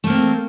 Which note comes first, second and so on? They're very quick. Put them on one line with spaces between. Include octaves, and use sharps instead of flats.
A3 A#3 C4